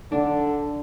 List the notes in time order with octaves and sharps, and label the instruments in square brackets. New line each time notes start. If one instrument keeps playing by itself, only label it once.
[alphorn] D3 [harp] D4